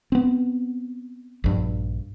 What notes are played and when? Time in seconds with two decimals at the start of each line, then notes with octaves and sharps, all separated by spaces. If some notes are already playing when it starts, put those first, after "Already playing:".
0.12 B3 C4
1.44 A#1 G2